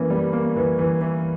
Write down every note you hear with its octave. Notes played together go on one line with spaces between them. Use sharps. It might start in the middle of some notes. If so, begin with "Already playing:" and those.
Already playing: E3 A#3 C#4
G3
A#3
E3
E3
E3